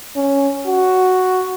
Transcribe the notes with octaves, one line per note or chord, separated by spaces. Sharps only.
C#4
F#4